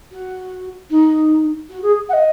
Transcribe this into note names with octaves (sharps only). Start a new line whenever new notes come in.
F#4
D#4
F#4
G#4
F#5
D#5